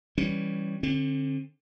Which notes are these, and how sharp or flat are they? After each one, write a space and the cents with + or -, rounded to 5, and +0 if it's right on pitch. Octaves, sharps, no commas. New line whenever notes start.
E3 +0 G3 +0 C#4 +0
D3 +0 C4 +40